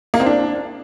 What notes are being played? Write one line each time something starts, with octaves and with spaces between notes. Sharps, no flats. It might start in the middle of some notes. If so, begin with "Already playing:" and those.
A#3
C4
D4